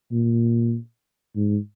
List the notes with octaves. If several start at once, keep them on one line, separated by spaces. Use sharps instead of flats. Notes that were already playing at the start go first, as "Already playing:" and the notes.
A#2
G#2